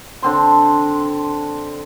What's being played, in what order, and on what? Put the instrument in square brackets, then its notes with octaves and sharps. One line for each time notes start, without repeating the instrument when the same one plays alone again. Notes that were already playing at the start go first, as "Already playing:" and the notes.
[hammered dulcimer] D3 C4 C6